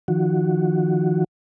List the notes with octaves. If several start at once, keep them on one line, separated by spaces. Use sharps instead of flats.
D#3 F3 F#4